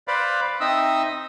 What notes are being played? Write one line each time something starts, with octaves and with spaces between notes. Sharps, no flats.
B4 C5 D5 F5 B5
C4 D#4 D#5 E5 D#6 E6